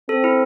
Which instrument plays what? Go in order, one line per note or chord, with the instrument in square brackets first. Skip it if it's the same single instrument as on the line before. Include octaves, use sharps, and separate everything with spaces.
[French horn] C4 [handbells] A4
[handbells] E4